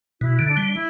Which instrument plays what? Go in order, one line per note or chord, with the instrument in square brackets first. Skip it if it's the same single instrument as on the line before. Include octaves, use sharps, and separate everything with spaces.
[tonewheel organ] B2 [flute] E4
[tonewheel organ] D3
[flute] D4
[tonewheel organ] G3
[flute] D4
E4